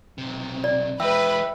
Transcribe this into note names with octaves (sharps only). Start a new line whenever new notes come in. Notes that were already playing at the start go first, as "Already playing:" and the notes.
B1 C3
D5
E3 G#3 B4 E5 G5 E6